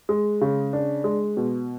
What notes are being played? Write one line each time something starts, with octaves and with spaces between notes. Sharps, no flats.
G#3
C#3
D4
G#3
B2